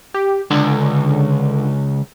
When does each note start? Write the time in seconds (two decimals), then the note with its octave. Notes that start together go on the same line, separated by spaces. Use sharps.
0.14 G4
0.51 C#2 D3